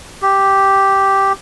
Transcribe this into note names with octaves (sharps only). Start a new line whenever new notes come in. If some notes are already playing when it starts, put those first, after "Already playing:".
G4